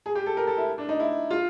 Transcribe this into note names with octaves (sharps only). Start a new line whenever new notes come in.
G#4
G4
A4
A#4
A4
E4
D4
D#4
E4
F4